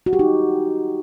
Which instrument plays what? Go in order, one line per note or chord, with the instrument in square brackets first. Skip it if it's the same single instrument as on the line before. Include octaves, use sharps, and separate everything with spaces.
[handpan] F#4
G4
D#4